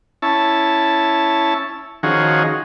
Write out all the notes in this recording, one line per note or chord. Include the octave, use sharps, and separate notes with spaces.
C#4 E4 A5
D#3 F3 C#4 F#4 G#4